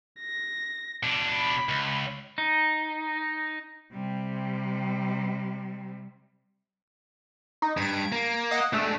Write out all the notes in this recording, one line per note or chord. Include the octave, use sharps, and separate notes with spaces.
A#6
B2 D4
B5
C#2
D#4
C3 G3
D#4
G2 G#6 D7
A#3
D#5 F#5
G#3 A3 D4